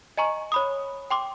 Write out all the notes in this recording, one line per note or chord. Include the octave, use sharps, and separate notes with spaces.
D#5 G#5 A#5 C#6
C#5 B5 D#6
G5 C6 D6